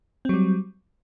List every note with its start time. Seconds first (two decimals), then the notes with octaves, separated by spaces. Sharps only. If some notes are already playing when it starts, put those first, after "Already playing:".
0.25 C4
0.29 F#3
0.33 G3